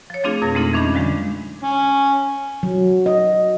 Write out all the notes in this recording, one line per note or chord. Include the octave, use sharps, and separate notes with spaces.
F3 C#5
F3 A3 C4 D4 F4 G#4
F2 B2 A6 A#6
G#3 A3 C4 D#4 F4 A4
E3 C#4 D4 D#5 B5 G6
D3 F3 G3 G#3
C#4
F#3
D#5